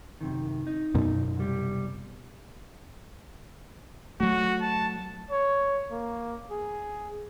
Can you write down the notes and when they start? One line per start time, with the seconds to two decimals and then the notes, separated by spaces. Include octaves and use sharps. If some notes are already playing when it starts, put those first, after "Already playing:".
0.21 F#2 C3 D#3
0.67 D#4
0.95 F#2 B2
1.36 C2 G3
4.20 F#3 A3 F#4
4.61 A5
5.31 C#5
5.91 A#3
6.51 G#4